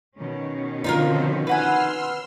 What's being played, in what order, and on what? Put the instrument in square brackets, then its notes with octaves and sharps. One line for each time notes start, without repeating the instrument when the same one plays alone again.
[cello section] B2 D#3 C#4
[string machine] D3 F3 C4 [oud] D#4 F4 A#4
[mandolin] B4 F#5 G#5 [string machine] C6 E6 F6